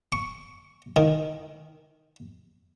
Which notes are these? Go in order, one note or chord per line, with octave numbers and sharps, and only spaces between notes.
C#6
D#3